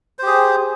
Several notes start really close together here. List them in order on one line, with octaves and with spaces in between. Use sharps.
C5 G4 G#4